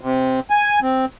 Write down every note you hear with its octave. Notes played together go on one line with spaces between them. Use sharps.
C3
G#5
C4